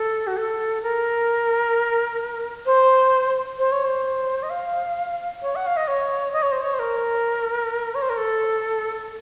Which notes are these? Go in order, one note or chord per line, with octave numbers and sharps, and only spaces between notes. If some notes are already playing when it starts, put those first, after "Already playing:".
Already playing: A4
F#4
A4
A#4
C5
C5
C#5
C5
D#5
F5
C#5
F#5
F5
D#5
C#5
D#5
C#5
C5
C#5
C5
A#4
C#5
C5
A#4
A4